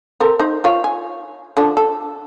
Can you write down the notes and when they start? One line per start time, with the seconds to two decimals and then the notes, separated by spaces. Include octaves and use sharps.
0.20 C4 A4 A#4
0.39 D#4 C5
0.64 F4 C#5 F5
0.84 G#5
1.57 D3 F3 D4
1.77 A4